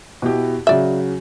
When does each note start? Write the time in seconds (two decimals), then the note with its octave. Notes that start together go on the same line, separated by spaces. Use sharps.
0.22 B2 E4 G4
0.67 C#3 F#3 F#4 D5 E5